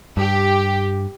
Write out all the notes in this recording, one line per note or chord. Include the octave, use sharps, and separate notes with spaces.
G2 G4